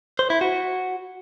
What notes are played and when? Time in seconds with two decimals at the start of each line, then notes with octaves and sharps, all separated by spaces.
0.19 C5
0.30 E4
0.41 F#4